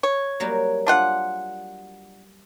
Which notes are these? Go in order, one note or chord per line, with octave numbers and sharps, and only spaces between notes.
C#5
F#3 G3 A#3
D4 F4 F#5